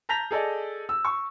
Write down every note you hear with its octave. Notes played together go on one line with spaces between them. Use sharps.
A5 A#5 G6 A#6 B6 F7
G#4 A4 D5 D#5
E6
C#6